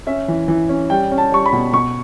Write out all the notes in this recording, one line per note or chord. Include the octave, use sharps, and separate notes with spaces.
C#4 E5
E3
E3
C#4
G3 G5
C#4
A5
G3 C#6
B5
B2
B2 C#6